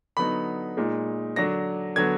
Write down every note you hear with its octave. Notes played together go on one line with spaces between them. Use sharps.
D3 F#3 B3 D#4 B5
A#2 G#3 D#4
D3 F#3 D4 A#6
D3 F#3 B3 G#6